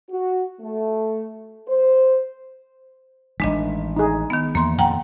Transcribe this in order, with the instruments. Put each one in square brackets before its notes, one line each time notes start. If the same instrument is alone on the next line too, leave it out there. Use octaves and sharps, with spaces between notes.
[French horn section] F#4
A3
C5
[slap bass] A1 D#3 [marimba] G#3 D4 D#5
[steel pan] D#4 G#4
[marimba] D#3 B3
[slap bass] E2 [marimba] A#3 C6
[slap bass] F2 A#2 D3 [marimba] F#5 G5 A#5